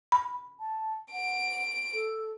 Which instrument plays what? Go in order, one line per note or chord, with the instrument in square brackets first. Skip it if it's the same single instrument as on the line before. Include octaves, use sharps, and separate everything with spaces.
[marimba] B5
[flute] A5
[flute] F#5 [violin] D7
[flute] A4